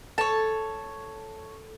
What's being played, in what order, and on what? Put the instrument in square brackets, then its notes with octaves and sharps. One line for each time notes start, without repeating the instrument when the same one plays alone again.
[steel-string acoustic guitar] A4 [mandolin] C#5 A5